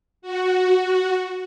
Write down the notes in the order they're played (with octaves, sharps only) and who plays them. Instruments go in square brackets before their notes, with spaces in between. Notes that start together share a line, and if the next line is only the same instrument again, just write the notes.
[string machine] F#4